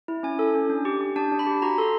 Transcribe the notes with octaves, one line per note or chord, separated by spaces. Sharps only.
E4
C#4 G#5
A4
C#4
D4
G4
G4
D4 A5
D4
B5
G4
F#4 A#5
A4 C6